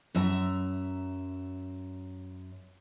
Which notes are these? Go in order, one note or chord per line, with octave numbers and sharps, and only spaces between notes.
F#2 E5 A5 A#5